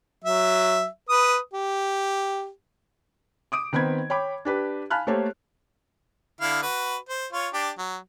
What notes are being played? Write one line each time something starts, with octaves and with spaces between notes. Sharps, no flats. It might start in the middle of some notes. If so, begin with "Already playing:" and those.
F#3 E5
B4 D#6
G4
D6 D#6 D7
D#3 B3 C4 B5 G#6
C#5 G5 B5 D6
D4 G4 B4
F5 G#5 A5 B5 F6 F#6
A3 A#3 G4 A4 C5 C#5
D3 E4 F5
F#4 B4
C5
F4 C#5
D4 G4
F#3